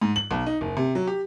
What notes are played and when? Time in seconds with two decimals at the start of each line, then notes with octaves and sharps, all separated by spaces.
0.02 G#2
0.16 F#7
0.31 B1
0.46 D#4
0.61 F#1
0.77 C3
0.95 F#3
1.07 G4